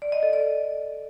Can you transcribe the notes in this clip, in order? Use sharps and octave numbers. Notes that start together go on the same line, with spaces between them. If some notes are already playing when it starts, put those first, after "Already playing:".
D5
D#5
A4
D5